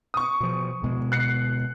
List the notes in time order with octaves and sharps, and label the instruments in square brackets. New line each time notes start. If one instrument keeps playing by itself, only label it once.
[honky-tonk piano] C#6 D#6
[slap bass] B2 F3
D2 B2 G#3
[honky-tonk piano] F#6 C7 C#7